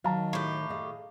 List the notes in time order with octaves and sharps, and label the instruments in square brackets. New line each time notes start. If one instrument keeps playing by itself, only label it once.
[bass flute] D#3 [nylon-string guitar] F#3 [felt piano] F5 A5 A#5
[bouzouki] A2 G4
[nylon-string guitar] G#4 A4 D#5 [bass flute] F5